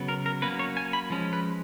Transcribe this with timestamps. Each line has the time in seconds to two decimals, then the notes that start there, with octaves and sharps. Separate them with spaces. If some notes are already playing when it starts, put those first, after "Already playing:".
Already playing: C#3 F#3 B3
0.08 A#4
0.26 A#4
0.42 F#3 A#3 C#4 B4
0.59 C#5
0.77 G#5
0.93 B5
1.10 F3 G#3 C#4
1.33 B4